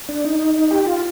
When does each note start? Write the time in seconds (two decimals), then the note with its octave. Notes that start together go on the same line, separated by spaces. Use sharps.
0.09 D4
0.25 D#4
0.71 G4
0.86 F4